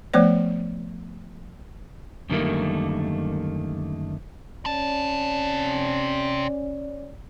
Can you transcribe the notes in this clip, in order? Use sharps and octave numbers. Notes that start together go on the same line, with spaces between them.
F3 A3 B3 C5 D5
F#2 D3 D#3 G3 A3 A#3
C3 C#4 D5 A5